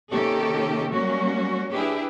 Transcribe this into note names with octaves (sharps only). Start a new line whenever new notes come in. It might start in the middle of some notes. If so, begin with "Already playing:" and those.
C3 D#3 A#3 C#4 G4 A4
F#3 G3 A#3 C#4 F#4
D4 E4 G4 G#4 B4